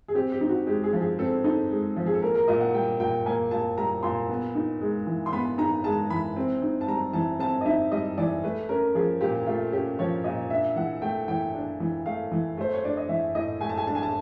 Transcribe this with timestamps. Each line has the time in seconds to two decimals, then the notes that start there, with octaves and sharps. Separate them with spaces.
0.08 G#4
0.15 C4 G4
0.32 G4
0.41 D#4
0.49 F#4
0.66 G#3 G4
0.84 G#4
0.93 F3
1.01 G#4
1.19 C4 A4
1.44 D#4 A4
1.71 G#3
1.96 F3
2.06 G#4
2.14 A4
2.22 A#3 A#4
2.35 A#4
2.48 A#2 D#5
2.61 F#5
2.74 G3 G5
3.00 A#2 G5
3.26 A#3 G#5
3.51 A#2 A5
3.77 G3 A#5
4.03 A#2 C6
4.29 B3
4.55 D#4
4.81 G#3
5.07 E3
5.26 C6
5.33 B3 B5
5.58 D#4 A#5
5.84 G#3 A5
6.10 E3 B5
6.36 C4
6.62 D#4
6.81 A5
6.88 G3 A#5
7.13 E3 A5
7.39 C4 A5
7.61 D#5
7.66 D#4 E5
7.92 G3 D#5
8.18 E3 D5
8.43 A3 B4
8.69 C#4 A#4
8.95 F3 G#4
9.21 A#2 G4
9.47 A3 F4
9.72 C#4 G4
9.99 F3 C#5
10.24 A#2 D#5
10.50 D4 E5
10.76 E3 F#5
11.02 A3 G5
11.28 E3 G5
11.54 D4
11.80 E3
12.06 A3 F5
12.32 E3
12.57 A3 C5
12.73 C#5
12.84 D4 D5
12.97 D#5
13.09 E3 E5
13.35 A2 D#5
13.61 A3 G#5
13.69 A5
13.78 G#5
13.87 D4 A5
13.95 G#5
14.03 A5